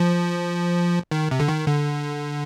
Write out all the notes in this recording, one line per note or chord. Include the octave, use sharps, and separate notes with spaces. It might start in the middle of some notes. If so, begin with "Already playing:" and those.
Already playing: F3
D#3
C3
D3
D#3
D3